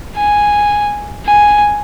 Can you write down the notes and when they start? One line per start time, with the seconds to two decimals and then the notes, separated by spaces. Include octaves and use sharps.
0.17 G#5
1.27 G#5